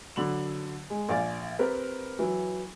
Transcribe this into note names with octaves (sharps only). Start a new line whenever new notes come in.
D3 F#3 B5 F#7
G#3
A#1 D5 F5 G#5 A6
C4 G4 A#4 B4
E3 F#3